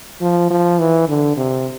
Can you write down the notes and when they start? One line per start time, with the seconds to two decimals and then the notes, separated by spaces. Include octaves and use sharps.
0.21 F3
0.50 F3
0.79 E3
1.08 D3
1.37 C3